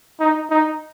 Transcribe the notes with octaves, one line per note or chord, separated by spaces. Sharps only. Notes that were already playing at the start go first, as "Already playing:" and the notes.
D#4
D#4